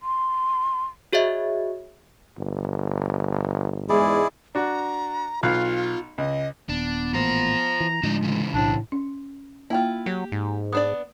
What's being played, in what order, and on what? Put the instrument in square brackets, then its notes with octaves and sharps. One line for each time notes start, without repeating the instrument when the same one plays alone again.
[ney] C6
[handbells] F#4 G#4 C#5 D#5 E5
[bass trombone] G1
[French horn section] E2 G#2 G#3 [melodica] E4 G#4 D5
[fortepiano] D4 F#4 [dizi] A#5
[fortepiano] B1 F5 F#6 [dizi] F4
[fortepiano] C#2 [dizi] D#5
[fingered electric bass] D#1 [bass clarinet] B3 [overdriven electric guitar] D4
[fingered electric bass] A1 A#2 [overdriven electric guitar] F4 C5 [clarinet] A#5
[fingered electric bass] E3
[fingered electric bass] A2 D3 F3 [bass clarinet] G#3 [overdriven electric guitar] D4 D#4
[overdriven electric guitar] C#3 E3
[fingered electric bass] B1 [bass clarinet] A2 [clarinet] D4
[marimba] C#4
[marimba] A#3 G5 [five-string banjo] E4 F4
[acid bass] F#3 [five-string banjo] G4
[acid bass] G#2
[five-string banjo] B3 D4 D5 [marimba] D#6